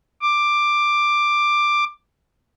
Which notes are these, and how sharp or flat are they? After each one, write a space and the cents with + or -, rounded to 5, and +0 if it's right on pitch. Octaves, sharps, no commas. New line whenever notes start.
D6 +10